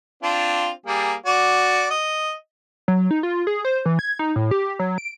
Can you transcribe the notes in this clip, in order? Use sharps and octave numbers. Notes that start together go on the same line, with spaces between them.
C4 D4 F4
G3 A#3 G#4
F#4 D5
D#5
F#3
D#4
F4
G#4
C5
E3
G#6
D#4
A2
G4
F#3
D7